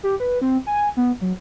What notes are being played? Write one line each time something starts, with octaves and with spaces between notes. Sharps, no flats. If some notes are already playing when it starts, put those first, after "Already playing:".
G4
B4
C4
G#5
B3
F#3